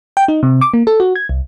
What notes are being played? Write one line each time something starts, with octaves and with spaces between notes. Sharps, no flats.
G5
D#4
C3
D6
A#3
A4
F#4
G#6
C2